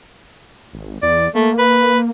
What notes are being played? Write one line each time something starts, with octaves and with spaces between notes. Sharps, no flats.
G#1
E2 D5
A3 A#3
B4